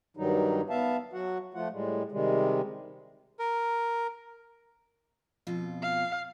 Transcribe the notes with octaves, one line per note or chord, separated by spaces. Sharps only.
G2 D#3 F#3 G3 D#4
B3 E5 F5 A5
F#3 F#4 F#5
F3 A3 F4 F#5
A2 G3 G#3
C3 D#3 G3 G#3
A#4
F2 B2 F4
F5